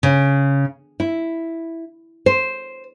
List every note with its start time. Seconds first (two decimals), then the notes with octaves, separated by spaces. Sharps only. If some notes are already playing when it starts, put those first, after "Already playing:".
0.03 C#3
1.00 E4
2.26 C5